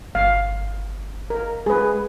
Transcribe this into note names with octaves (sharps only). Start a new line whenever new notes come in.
G1 F5
A#4
G#3 G#4 B4